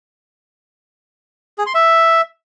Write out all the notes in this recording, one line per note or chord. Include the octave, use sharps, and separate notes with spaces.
G#4
C6
E5